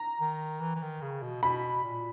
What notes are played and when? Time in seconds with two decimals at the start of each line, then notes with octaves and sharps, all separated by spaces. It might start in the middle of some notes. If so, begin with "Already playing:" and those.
Already playing: A#5
0.21 D#3
0.61 E3
0.75 E3
0.82 D#3
1.02 C#3
1.22 B2
1.43 B2 B5
1.84 A#2